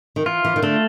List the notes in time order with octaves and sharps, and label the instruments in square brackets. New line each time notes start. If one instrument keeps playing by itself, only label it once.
[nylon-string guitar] D#3
[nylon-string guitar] E3 [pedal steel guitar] F4
[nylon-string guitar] E3
D#3
[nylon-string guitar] D3 [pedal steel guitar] A3